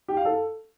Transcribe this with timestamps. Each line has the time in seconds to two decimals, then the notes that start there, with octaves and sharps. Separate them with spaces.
0.08 G4
0.17 F5
0.25 A4